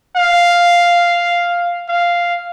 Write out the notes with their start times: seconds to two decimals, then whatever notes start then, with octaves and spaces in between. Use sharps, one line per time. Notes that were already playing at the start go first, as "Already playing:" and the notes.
0.16 F5
1.89 F5